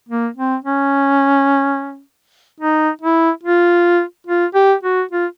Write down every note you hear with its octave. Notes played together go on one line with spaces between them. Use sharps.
A#3
C4
C#4
D#4
E4
F4
F4
G4
F#4
F4